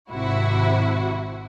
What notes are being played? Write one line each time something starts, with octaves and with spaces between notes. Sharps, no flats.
G#1 C3 E4 F#4